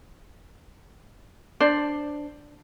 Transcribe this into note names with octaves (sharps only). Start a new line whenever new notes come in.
D4 C5 D5